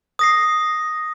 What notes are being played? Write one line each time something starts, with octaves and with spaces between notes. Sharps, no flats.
D#6 A#6 C7